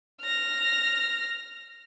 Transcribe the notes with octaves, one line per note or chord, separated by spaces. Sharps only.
F6 A#6